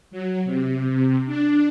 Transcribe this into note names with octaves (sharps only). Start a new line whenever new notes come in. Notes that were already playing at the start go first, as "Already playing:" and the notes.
F#3
C3
C3
D4